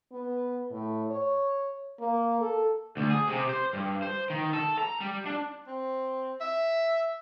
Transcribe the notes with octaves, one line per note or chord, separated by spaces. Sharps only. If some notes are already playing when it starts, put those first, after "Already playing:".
B3
A2
C#5
A#3
A4
D2
G#4
C3
C5
G2
C5
D#3
A4
A#5
G3
D4
C4
E5